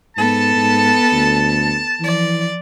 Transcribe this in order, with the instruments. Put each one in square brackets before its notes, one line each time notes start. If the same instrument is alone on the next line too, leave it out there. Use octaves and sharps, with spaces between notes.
[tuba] G#2 [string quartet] B3 A4 [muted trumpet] A5
[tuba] G#2
D2
[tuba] E3 [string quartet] F3 D5